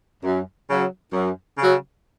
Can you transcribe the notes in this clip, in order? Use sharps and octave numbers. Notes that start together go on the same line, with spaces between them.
F#2
C#3 F#3
F#2
C#3 F#3